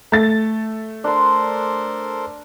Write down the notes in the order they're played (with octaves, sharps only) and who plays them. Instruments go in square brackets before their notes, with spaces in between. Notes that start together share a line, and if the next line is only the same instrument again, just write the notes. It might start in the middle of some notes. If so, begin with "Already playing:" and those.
[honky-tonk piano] A3 A6
[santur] D4 C6 [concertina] A4 A#4 C5